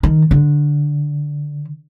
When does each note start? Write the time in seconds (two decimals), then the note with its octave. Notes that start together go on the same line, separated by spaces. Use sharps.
0.03 D#3
0.31 D3